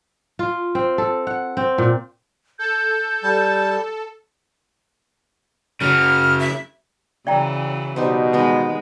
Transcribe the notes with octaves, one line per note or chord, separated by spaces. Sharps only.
F4
C4
A4
F#5
C4
A#2
A4 G6
G3 A5
C#3 F#3 F6
E5
C#3 E3 F#3 D5 G5 A#5
B2 G3 D#4 C5
D#3 G#3 B3 D#4